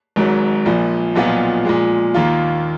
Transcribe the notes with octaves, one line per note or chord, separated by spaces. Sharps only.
G#1 G#2 F#3
A#1 A#2 F3
B1 A#2 F3 B3 F4
A#2 F3 G#3
D#2 D#3 A#3 F4